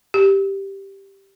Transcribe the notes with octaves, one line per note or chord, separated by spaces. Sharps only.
G4